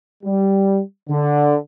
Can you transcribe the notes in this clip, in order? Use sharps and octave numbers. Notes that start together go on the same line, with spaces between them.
G3
D3